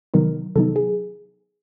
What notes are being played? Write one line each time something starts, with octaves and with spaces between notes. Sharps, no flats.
C3 D#3 F#3 B3 D#4 A#4
C3 D#3 F#3 B3 D#4 A4
G#4